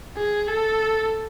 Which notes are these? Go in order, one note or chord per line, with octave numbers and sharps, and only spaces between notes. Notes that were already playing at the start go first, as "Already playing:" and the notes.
G#4
A4